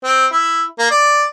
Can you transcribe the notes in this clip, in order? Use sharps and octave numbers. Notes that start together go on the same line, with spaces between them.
C4
E4
A#3
D5